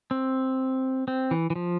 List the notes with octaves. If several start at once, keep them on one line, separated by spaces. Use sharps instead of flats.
C4
C4
E3
E3
F3